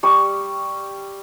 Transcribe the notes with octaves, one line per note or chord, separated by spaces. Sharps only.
G3 C#6